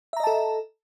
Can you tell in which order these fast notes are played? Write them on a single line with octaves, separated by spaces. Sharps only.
E5 A#5 D#5 A5 A4